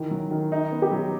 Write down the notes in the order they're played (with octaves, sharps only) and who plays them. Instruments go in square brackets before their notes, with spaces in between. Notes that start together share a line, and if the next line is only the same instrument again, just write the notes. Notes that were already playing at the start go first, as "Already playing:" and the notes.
Already playing: [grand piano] D#3 E3
F#3
D#3
D#4
B3
[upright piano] G4
[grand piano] F#3